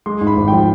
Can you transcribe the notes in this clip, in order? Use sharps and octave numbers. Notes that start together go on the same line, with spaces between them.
G#3 C6
G#2
B5
G#1
F3 G5